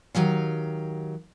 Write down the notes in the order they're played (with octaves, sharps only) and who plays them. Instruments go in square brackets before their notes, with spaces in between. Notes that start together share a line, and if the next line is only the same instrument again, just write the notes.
[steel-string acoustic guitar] D#3 F#3 G4 F5